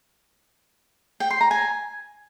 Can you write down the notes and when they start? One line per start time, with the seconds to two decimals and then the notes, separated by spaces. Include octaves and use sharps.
1.20 G5
1.30 C6
1.41 A#5
1.51 G#5